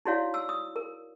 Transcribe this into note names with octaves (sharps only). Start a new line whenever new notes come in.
D#4 E4 F#4 C#5 D5 F5
E6
D#6
A#4